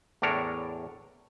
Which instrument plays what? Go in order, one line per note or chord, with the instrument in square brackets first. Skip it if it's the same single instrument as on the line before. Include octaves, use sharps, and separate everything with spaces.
[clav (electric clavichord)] E2 A2 D4 A#4 C#5 A#5